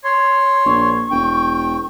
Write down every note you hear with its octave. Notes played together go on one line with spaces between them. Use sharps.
C#5 C6
A#1 C#6
E1 G5